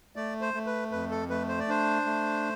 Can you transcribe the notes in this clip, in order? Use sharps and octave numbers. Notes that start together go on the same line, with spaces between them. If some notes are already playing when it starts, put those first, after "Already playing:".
A3 D5
C5
A3
B4
F2 B4
A4
A3 B4
C5
D5
D4 C5
A3